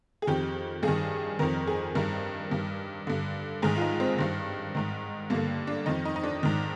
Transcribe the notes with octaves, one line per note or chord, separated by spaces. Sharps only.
G#4
F2 D#3 G4
G2 D#3 G#4
F2 D#3 A#4
G#4
G2 D#3 A#4
G2 D#3
G2 D3
G#2 D#3 G#4
F4
D#4
C4
G2 D#3
G#2 D#3
G2 D3 A#3
D4
F2 D#3 D#4
D#4
D#4
D4
G#2 D#3